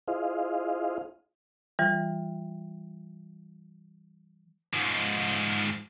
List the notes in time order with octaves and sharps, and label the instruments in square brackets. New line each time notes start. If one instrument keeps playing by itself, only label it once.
[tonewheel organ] E4 F4 G#4 C5 D#5 F5
[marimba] E3 G3 F4
[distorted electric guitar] G#2 F3